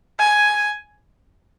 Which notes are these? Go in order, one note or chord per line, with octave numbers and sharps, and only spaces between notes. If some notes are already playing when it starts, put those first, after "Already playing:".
G#5